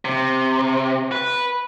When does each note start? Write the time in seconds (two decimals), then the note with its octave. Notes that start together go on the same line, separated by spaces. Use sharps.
0.05 C3
1.12 B4